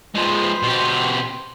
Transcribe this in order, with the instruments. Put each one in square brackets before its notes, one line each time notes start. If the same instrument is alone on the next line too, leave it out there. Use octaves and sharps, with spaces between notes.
[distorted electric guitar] F3 G#3 [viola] B4 C5
[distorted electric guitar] B2 G4